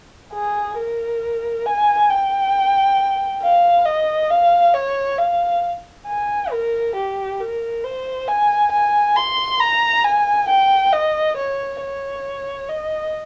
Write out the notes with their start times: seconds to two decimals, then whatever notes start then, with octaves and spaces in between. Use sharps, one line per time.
0.33 G#4
0.77 A#4
1.66 G#5
2.09 G5
3.42 F5
3.86 D#5
4.30 F5
4.74 C#5
5.19 F5
6.07 G#5
6.51 A#4
6.95 G4
7.40 A#4
7.84 C5
8.28 G#5
8.72 G#5
9.16 C6
9.60 A#5
10.04 G#5
10.48 G5
10.93 D#5
11.37 C#5
11.81 C#5
12.69 D#5